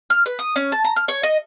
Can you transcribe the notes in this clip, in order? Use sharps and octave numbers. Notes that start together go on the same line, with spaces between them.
F6
B4
D#6
C#4
A5
A#5
F6
C#5
D#5